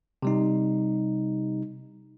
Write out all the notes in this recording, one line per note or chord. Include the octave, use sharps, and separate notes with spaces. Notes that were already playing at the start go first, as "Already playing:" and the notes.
C3 G3 D#4